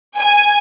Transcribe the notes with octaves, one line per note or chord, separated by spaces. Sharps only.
G#5